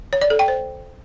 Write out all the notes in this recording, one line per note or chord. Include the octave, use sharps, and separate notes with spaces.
C#5
D5
A4
G5
C5